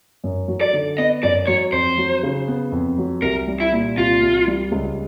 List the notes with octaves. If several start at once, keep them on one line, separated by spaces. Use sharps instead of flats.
F#2
F#3
D5
D3
B3 D#5
F#2 D5
F#3 C#5
F2 C5
F#3
C#3
B3
F2
F#3
C2 A#4
G3
E4
A#2
C2 F4
C2
G3
C#2